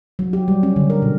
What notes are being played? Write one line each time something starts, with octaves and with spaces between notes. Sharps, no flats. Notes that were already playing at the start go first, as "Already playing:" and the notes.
F#3
G4
G3
C#4
D3
A#4
B2